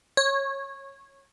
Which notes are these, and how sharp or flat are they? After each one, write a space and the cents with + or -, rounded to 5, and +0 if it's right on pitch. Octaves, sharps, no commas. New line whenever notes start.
C#5 -20